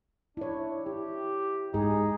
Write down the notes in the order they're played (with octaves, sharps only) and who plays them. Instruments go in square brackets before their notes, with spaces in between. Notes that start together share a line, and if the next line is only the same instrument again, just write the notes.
[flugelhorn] D4 [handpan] E4 C#5
[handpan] E4 [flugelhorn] G4
[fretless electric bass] G#2 [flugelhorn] D#4 [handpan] G#4